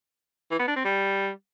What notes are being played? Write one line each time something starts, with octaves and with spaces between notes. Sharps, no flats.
E3
B3
D4
C4
G3